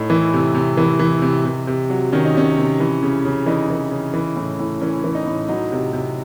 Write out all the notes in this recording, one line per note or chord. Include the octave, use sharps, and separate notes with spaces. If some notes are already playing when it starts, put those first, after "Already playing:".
Already playing: A2 D#4
E3
C3
C3
E3
E3
C3
C3
C3
F#3
D#3 C#4
D#4
C3 C#4
C3
E3
C#3
C#3
E3 D#4
E3
C#3
E3
A2
A2
E3 C#4
E3
D#4
A2
F#3 D#4
C3
C3